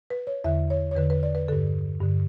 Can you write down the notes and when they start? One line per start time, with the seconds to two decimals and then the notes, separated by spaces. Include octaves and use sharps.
0.10 B4
0.27 C#5
0.44 E2 D3 E5
0.70 C#5
0.91 C#5
0.96 E2 D3 B4
1.10 B4
1.23 D5
1.35 B4
1.48 G2 D3 A4
2.00 G2 D3